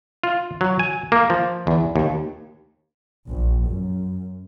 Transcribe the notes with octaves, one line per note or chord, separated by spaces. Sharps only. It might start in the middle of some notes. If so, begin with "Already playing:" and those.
F4
F#3
G#5
A#3
F3
E2
D#2
A#1
F#2